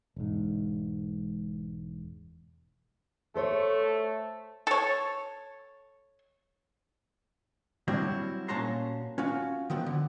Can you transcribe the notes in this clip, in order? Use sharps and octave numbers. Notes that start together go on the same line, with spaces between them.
E1 G#2
A3 A4 C5 C#5
A4 C#5
F#3 G3 C4 D4 E4 F#4
A#2 C#4 F#4 A5 A#5 C6
C#4 F4 F#4
D#3 F3 F#3 B3
D3